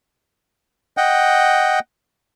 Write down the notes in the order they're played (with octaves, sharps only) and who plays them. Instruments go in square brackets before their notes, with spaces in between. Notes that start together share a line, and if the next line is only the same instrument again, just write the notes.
[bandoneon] D#5 F#5 G5